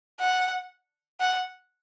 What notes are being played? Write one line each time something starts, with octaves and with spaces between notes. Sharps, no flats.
F#5
F#5